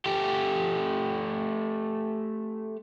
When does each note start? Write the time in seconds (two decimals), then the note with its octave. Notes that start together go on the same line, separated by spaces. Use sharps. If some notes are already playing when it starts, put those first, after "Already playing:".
0.06 A3 G4